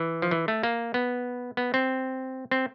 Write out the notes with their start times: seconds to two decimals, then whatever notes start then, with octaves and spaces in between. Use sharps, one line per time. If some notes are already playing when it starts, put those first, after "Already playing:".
Already playing: E3
0.22 F3
0.31 E3
0.48 A3
0.63 A#3
0.94 B3
1.57 B3
1.74 C4
2.51 C4